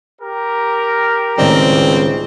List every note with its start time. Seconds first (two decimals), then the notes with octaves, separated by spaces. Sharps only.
0.21 G4 A#4
1.38 C#2 A2 D#3 G3 C4